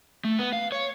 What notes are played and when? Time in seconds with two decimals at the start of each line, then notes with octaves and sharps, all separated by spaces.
0.25 A3
0.39 B3
0.53 F5
0.72 C#5